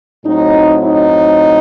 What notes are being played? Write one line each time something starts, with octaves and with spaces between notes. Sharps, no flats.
A2 F#3 C4 D#4
D#4